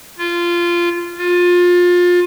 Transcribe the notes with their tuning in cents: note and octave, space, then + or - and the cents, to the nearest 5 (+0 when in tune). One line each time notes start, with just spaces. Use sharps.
F4 -15
F4 +25